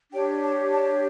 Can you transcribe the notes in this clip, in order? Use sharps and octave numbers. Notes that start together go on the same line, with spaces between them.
D4 G4 C#5 G5
A5
A5